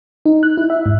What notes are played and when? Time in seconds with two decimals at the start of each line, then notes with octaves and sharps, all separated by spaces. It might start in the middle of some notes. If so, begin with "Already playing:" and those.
0.25 D#4
0.43 F#6
0.57 E4
0.70 E5
0.86 G#2